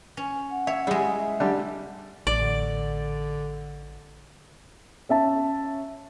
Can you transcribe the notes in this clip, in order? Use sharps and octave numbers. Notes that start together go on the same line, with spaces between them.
C#4
F#5
C#5 E5
G3 G#3 E4 G#4
E5
D3 G3
A1 D5
D3
C#4 E5 A5